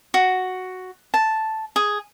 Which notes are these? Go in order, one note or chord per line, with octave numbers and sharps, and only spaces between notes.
F#4
A5
G#4